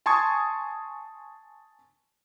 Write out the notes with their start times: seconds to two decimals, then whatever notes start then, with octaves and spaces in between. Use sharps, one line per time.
0.06 G#5 A5 C6 C#6 D#6 G#6